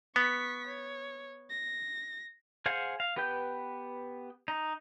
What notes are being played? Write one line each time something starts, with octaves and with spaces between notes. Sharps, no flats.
B3 C#6 B6
C#5
A#6
G#4 C5 F5 F#5 G#5
F5
B3 G4 B4 G5 G6
D#4